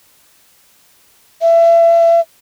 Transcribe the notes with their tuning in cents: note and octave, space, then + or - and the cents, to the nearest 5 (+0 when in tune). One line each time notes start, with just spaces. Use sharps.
E5 +30